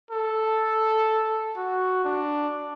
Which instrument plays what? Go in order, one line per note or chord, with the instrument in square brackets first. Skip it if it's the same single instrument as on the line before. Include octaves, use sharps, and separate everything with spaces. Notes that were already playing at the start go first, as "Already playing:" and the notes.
[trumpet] A4
F#4
D4